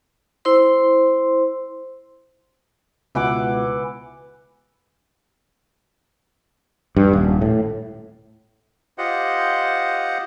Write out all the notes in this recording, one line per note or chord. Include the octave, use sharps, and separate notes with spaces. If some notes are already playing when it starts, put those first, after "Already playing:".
E4 C5 C6
C#2 B2 E3 F#5 D6
G2
D#1
A2
F4 G4 C5 D#5 F#5